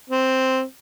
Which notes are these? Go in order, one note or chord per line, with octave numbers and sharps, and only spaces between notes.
C4